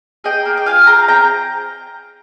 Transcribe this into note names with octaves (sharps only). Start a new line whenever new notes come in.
G#4 D#5 G5
A#3
G5
F4 F5 G#5
G#4 G5 A#5
C4 G5 A#5